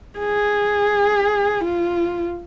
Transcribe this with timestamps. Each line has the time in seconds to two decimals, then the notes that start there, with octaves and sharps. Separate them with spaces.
0.19 G#4
1.64 F4